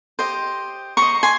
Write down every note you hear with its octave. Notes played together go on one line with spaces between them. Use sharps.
G4 C5 D#5
G4 C5 D#5 A#5 C#6
G#5 C6